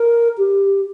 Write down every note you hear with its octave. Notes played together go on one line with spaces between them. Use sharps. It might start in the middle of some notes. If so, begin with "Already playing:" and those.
Already playing: A#4
G4